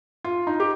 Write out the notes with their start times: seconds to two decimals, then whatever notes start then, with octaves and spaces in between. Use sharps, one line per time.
0.24 F4
0.47 D#4
0.60 G4